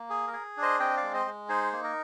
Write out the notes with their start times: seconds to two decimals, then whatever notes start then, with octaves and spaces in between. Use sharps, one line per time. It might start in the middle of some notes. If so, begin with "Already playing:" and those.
Already playing: A#3
0.10 G#4
0.27 A#4
0.33 G#4
0.57 D4
0.62 C5 D#5
0.80 C4 D#5 G5
0.97 D5 F5
1.03 G#3
1.14 C5 D#5
1.26 G#3
1.49 D#4 G#4 C5
1.72 A#3
1.84 A#4